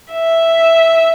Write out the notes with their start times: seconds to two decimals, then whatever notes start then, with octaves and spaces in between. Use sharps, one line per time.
0.13 E5